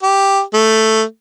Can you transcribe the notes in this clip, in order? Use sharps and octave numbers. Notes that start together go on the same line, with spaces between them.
G4
A3